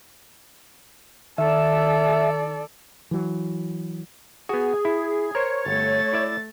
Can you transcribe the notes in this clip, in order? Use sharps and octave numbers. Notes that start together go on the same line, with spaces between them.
D#3 A4 D5 E5
E3 F#3
B3 F#4 G#4
E4
A#4 C5 C#5
G1 A3 A6
E4 D5 E5